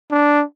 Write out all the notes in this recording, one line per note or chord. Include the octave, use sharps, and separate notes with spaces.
D4